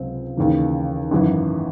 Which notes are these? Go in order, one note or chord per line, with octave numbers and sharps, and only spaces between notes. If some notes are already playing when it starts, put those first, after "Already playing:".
Already playing: C#2 C3 F#3 C4
D#2 C#3 E3
G#1 F#2 E3